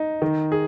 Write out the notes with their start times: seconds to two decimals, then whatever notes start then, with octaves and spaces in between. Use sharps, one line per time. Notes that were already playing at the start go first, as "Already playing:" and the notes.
Already playing: D#4
0.22 D#3
0.52 G#4